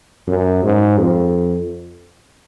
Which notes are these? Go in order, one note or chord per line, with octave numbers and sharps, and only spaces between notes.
F#2
G#2
F2